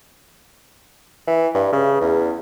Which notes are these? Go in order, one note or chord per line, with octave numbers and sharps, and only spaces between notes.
E3
G2
C#3
E2